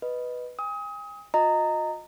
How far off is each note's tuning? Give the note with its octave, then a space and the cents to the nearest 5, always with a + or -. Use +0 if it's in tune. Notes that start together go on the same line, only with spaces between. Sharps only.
B4 +0 D#5 +0
G#5 -40 D#6 +30
F4 +45 D#5 +0 A#5 -15